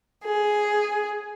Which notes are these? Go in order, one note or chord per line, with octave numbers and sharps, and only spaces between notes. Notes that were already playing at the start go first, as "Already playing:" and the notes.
G#4